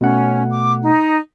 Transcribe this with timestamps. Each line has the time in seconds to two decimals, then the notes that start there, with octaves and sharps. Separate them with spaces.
0.01 B2 A3 C#4 F#5
0.50 D6
0.83 D#4